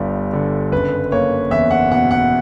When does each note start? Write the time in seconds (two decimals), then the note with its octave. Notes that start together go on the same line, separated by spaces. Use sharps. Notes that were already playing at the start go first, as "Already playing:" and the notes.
Already playing: G1 G2 G3
0.33 D3
0.72 F#1 B4
1.12 A#3 C#5
1.51 E2 E5
1.71 F#5
1.92 B2 F#5
2.11 F#5